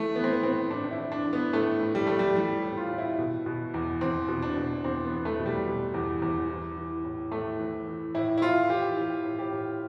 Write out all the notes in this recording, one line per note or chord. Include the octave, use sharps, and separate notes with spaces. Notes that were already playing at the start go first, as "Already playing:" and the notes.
Already playing: E3 A3
E3 B3
C4
B3
A2 C4
A2 D4
D4
E4
E3
D4
E3
B3
A2 A3
A2
G3
E3 A3
G3
E3 G3
A2
F4
A2
E4
B2
B2
E2
E2 C4
B2
D4
B2
E2 C4
B3
E2
A3
B2
G3
B2
E2
E2
E3
E3
A2
A2 A3
E3
E3
A2 E4
E4
A2 F4
E3 G4
E3 G4
A2
G4
A2